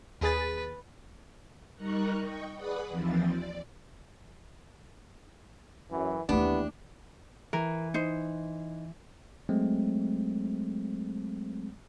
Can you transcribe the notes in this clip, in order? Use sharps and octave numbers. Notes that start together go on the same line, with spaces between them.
D#2 G#4 B4 A6
G3 D#4 A#4 A#5 C#6 F#6
D#5 G5 C#6
G#4 B4 D5 F#5 B5 D#6
D#2 E3 F3 C4 A6
D5
F#2 E3
D#2 E3 A3 B3 D4 G4
E3 A#4
D#4 C5
F#3 G#3 A3 C4